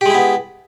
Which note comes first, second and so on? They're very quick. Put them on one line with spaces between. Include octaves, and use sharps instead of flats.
G4 G#3 E4 B3